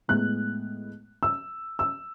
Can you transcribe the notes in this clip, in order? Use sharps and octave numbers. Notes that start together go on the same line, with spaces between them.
A2 G#3 B3 F#6
E6
E6